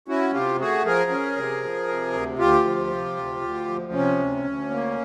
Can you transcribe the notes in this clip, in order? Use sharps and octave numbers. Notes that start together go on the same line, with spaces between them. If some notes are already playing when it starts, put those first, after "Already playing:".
C#4 E4 F#4
C3 F4 G4
A3 F#4 G#4
F3 G#4 A#4
C#4
C3
F3
C3
D2
D2 F4 G4
F3
C3
D2
D2
F3
C3 C#4
D2
D2
A#3